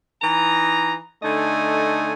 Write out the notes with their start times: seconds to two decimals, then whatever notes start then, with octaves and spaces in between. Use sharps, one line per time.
0.22 E3 D#4 A#5
1.23 D3 A3 D#4 D#5 G#5